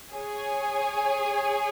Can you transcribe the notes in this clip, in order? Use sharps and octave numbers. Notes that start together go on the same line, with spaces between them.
G#4 C#5 G#5